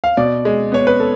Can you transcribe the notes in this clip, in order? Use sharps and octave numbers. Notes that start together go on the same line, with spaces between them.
F5
B2 D5
G#3
B3 C#5
B4
A4